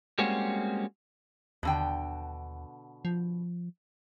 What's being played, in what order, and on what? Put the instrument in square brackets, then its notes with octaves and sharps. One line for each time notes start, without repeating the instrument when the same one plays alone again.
[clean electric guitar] G3 G#3 A#3 C4 C#4 F#4
[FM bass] D#2 [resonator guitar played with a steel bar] B2 D3 G5
[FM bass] F3